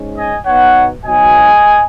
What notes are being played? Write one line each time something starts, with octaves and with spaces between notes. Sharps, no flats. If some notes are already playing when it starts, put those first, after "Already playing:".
Already playing: G#2 G#3 C#4
D#5 G#5
B2 B3 D#4 C#5 F#5
B2 F#3 B3 D#4 D#5 G#5